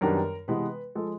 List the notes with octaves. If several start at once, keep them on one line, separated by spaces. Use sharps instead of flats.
F#2 D#3 G3 B3 D4 A#4
C3 E3 G#3 B3 B4
F3 G#3 A4